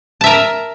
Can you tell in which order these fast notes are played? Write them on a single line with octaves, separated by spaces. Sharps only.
A5 E5 A#4